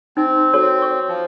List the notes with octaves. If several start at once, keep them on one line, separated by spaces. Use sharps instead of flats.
C4 D#4
F#4 A4 C#5
C#5 C#6
F3